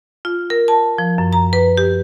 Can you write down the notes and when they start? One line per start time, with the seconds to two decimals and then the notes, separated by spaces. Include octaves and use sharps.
0.25 F4
0.50 A#4
0.68 A5
0.98 F3
1.18 F#2
1.33 A#5
1.53 B4
1.78 G4